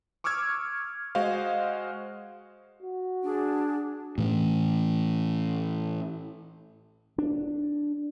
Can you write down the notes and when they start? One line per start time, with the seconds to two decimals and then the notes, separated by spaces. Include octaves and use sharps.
0.24 C#6 D6 E6 F6 G#6
1.15 G#3 F#4 C5 D#5 F5
2.83 F#4
3.23 D4 G#4
4.18 A2 E3
7.18 D4